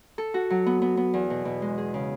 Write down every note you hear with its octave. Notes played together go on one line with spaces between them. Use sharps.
A4
F#4
F#3
B3
B3
B3
E2
B2
B2
G#3
G#4
C#3